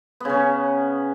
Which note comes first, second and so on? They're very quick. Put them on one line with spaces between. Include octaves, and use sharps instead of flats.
B3 C#3 C#4